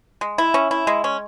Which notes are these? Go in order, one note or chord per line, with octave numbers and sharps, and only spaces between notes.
G#3
E4
C#4
E4
G#3
C#4